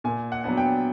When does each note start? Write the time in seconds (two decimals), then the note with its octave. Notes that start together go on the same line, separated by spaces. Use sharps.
0.04 A#2 G#5
0.32 F#5
0.44 F#3 B3 D4
0.57 G5